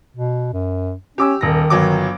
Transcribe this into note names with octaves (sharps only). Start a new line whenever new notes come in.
B2
F#2
C#4 G4 D6 E6
D#1 D#3 A#6
G1 F#3 D6